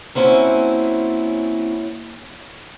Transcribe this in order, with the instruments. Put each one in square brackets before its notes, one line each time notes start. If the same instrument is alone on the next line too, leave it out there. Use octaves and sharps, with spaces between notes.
[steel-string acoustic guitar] A#3 C4 C#4 E4 F#4